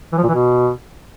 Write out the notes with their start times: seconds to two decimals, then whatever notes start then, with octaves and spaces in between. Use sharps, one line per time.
0.13 E3
0.18 F3
0.23 A#2
0.29 E3
0.34 B2